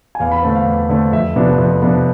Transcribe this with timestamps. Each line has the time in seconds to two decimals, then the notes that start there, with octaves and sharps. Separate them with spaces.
0.15 G#5
0.20 E2 F5
0.32 B5
0.42 D3 A3 C4 A5
0.55 F5
0.66 E2
0.89 D3 A3 C4
1.12 F2 E5
1.36 C3 F3 B3 D4
1.58 F2
1.82 C3 F3 B3 D4